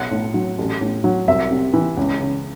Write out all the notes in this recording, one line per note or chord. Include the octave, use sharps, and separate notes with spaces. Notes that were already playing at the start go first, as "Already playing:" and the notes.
Already playing: B1 F#3 F#5
A2
F#3
A1
A2
F#3
C2 E5
C3
E3
C#2
C#3